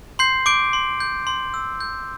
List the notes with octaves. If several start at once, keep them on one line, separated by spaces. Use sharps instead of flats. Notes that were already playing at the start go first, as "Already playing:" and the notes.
C6 G6 C7
D6 G6 D7
C6
G6
C6
E6
G6